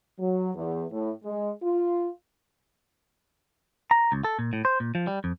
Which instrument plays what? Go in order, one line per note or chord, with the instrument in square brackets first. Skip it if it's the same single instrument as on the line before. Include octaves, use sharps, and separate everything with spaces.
[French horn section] F#3
E2
A2
G#3
F4
[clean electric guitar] A#5
C#2
A4
A#2
A2
C5
A#2
F3
G3
F2